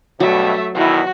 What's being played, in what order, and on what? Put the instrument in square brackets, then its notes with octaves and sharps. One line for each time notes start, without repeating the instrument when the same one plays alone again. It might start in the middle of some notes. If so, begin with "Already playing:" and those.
[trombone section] G2 B2 [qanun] F#3 [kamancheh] A3 E5
[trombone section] E2 B2 D#3 [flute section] E4 [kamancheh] F#4